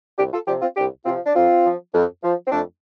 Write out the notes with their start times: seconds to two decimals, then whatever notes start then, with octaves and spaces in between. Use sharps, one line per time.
0.19 C2 D4 G4
0.33 F4 A4
0.47 C3 F3 D4 G4
0.62 C4 F4
0.77 C2 D4 G4
1.06 C3 F3 C4 F4
1.26 D4
1.35 F2 C4 F4
1.65 F3
1.94 F2
2.24 F3
2.47 C4
2.52 F2 A3 D4